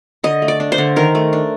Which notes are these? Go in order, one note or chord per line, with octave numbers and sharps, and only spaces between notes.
D3 D#5
A3
D5
D4
C5
D3
D#3 A#4
A3
D4